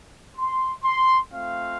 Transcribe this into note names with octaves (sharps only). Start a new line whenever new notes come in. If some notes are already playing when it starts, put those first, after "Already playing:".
C6
C6
A3 C4 F4 F5